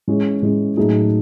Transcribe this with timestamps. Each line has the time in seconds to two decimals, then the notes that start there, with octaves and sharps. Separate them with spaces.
0.08 E3 G#3 C#4
0.43 E3 G#3 C#4
0.77 A2 F#3 A3 D#4 G#4